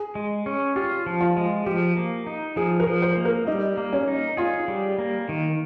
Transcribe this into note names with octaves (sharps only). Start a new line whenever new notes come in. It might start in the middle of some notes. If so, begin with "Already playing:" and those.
Already playing: G#4
G#3
C#4
F4 G4
F3
F4
G#3
F3 G4
A#3
D#4
F3 G#4
A#4
F3
C5
A#3
A#4
G3 D#4
A#3
C#4
D#4
F4 G#4
G3
A#3
D#3